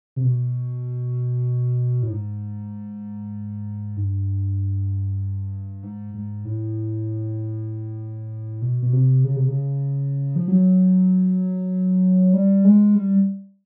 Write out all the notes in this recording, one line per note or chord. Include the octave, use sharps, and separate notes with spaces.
C3
B2
A2
G#2
G2
G#2
G#2
A2
B2
B2
C3
C#3
C3
C#3
F3
F#3
G3
G#3
G3